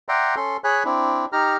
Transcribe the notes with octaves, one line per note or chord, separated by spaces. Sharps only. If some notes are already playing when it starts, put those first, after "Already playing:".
D5 E5 F#5 G5 A#5 C6
C#4 A4 C6
G#4 C#5 G#5 B5 F#6
C4 D4 E4
D#4 G4 A#5 F6